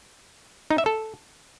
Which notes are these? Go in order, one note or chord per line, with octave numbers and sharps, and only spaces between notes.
D#4
E5
A4